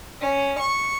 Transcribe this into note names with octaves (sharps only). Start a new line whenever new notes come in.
C#4
C#6